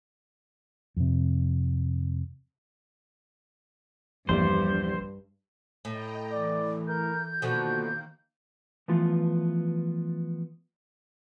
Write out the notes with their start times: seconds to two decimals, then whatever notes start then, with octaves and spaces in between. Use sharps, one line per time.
0.97 F2 C3
4.29 A#1 E2 G2 G3 C5 D5
5.85 A2 D#5 G5 A#5
6.31 E3 D5
6.88 A#4 G6
7.42 B2 D3 D#3 F3 A#3 F#4
8.88 E3 F3 A3 B3 F4